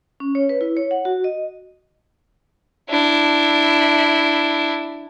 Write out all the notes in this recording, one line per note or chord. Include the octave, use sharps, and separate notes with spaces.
C#4
C#5
B4
E4
C#5
F#5
F#4
D#5
D4 E4